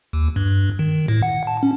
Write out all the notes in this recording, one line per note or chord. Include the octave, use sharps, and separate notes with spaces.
D#2
G2
D#3
A2
F#5
A5
C#4